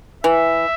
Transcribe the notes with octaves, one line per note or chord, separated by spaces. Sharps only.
E3 E5